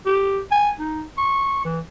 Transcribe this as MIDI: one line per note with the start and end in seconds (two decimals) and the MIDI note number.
0.06 0.40 67
0.51 0.70 80
0.80 1.03 63
1.18 1.60 85
1.65 1.79 52